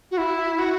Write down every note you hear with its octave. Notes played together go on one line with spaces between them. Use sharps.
F#4
E4
F#4